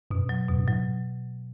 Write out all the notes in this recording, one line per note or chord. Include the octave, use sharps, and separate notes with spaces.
F#2 B2
F#3
E2 B2
F#2
G#2 F#3